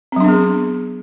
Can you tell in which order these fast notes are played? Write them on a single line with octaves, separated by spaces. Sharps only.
C4 F#3 D4 B3 G#4